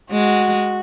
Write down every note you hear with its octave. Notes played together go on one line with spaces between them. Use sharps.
G#3 F#4